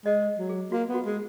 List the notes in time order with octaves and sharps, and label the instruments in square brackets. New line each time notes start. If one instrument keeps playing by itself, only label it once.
[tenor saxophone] G#3 [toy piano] D#5
[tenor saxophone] F#3
[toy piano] G#4
[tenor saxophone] A#3 [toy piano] F#4
[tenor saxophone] B3
[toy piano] F#4
[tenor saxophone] G#3